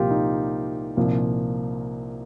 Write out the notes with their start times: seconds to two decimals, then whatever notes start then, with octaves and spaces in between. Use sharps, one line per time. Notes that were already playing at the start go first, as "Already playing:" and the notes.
Already playing: C2 A#2 F3 F4 G4
0.11 D#4
0.97 C2 A#2 F3